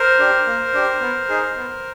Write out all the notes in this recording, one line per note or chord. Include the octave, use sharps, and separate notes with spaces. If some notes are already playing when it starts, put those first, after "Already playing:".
Already playing: A#4 C5
D4 G4
A#3
D4 G4
B3
D#4 G#4
B3